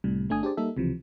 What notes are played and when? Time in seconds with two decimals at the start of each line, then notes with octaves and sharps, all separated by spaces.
0.04 C2 A2 C3 G3
0.29 G1 A3 D4 G#5 D#6
0.43 D4 G4 G#4 C5 D5
0.57 G3 A#3 D#4 A4 E5
0.77 C#2 C3 E3 F3